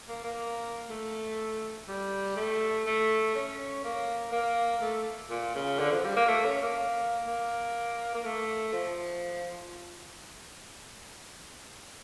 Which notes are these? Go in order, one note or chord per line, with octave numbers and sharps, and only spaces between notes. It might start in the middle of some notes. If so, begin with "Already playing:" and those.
A#3
A#3
A3
G3
A3
A3
C#4
A#3
A#3
A3
A#2
C#3
D3
F3
G3
A#3
A3
C#4
A#3
A#3
A#3
A3
F3